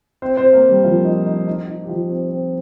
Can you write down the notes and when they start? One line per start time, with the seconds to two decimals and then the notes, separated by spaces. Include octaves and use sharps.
0.22 C4 C5
0.37 C4 C5
0.53 A#3 A#4
0.69 G3 G4
0.84 F3 F4
1.05 D#4
1.27 D#4
1.47 D#4
1.67 D#4
1.84 G4
1.89 F3 F4
2.09 C4
2.30 C4